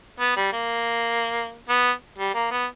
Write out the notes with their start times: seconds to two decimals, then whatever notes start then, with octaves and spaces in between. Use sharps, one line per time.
0.20 B3
0.36 G3
0.53 A#3
1.69 B3
2.18 G3
2.34 A#3
2.51 B3